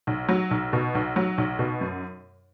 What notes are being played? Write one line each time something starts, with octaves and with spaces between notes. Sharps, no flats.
B1
F#3
B1
B2
B1
F#3
B1
B2
F#2